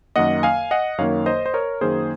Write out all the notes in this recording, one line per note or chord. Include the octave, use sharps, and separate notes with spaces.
F#2 D#3 A#3 D#5 F#5
F5 G#5
D#5 F#5
F#2 D#3 A#3 C#5 F5
C5 D#5
C5
A#4 C#5
F#2 D#3 A#3 G#4 C5